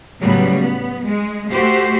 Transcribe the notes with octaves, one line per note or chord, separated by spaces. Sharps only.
A2 C#3 F#3 G3 B3
B3
G#3
A3 F#4 G4 C5